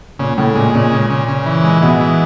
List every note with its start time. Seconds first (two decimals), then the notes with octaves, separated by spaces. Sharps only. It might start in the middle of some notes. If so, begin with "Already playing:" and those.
0.19 A#2 C#3
0.38 A2 C#3
0.55 A#2 G#3
0.74 A#2 C#3
0.92 C#3
1.10 C#3
1.28 C#3
1.46 E3
1.64 G#3
1.82 B2 G#3
2.01 E3